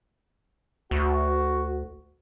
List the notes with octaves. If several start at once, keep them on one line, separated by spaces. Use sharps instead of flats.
D2 F#4